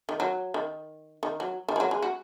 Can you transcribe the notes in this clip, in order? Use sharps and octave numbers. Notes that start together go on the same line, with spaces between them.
D#3
F#3
D#3
D#3
F#3
D#3
G#3
F#3
G#3
F#4